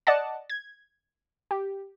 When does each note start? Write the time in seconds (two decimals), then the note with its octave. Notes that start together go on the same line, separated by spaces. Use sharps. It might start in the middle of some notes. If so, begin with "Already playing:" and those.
0.07 D5 D#5 F#5 A5
0.50 G#6
1.51 G4